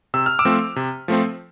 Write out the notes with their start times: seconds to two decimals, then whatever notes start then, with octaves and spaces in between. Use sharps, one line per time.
0.14 C3 E6
0.26 F6
0.39 D6 E6
0.45 F3 A3 C4
0.76 C3
1.08 F3 A3 C4